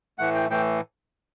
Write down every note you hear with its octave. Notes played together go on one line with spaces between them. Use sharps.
A2 E3 A3 F#5
G5
A2 E3 A3 G5